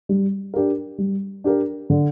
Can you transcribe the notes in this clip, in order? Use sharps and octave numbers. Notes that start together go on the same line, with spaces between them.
G3
D4 G4 A#4
G3
D4 G4 A#4
D3